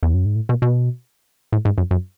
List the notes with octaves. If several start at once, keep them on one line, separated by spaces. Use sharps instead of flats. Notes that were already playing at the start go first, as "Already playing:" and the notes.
E2
F#2
G#2
A2
B2
B2
A2
G#2
F#2
F#2